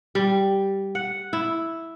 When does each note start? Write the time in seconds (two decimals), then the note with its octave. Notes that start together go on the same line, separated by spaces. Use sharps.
0.15 G3
0.95 F#5
1.33 E4